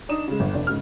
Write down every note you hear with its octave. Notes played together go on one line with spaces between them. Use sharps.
D4 D#4 D#6 E7
C#3 G#3
G1
F1 D4
G#2 C#3 F6